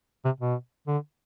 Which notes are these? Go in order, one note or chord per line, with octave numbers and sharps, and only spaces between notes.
C3
B2
D3